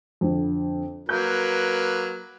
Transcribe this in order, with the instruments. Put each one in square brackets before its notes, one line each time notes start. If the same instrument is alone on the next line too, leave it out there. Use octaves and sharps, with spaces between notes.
[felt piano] F2 D3
[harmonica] F#3 A#3 B4 [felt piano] G6